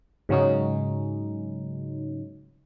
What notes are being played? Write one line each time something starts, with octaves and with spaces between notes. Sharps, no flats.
G#2 C#3 F#3 C#4 D#4